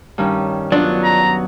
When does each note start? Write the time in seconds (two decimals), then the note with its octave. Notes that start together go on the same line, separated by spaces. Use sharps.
0.18 G2 D#3 C#4
0.72 F#3 B3 D4 F4 D5
1.04 A#5